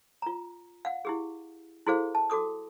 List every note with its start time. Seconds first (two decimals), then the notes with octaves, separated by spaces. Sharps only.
0.22 F4 A#5
0.85 F5 F#5
1.05 E4 G4 G#4
1.87 E4 F#4 G#4 A4 C5 F5
2.15 A5
2.30 F#4 A4 D6 D#6